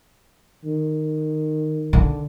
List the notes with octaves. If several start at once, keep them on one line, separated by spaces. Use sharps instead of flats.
D#3
D3